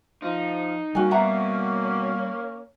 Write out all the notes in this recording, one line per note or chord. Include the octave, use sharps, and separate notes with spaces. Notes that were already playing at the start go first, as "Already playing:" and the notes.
F3 D#4
G3 A#3 C#4 F#4 G#5
B2 E5 F#5 A#5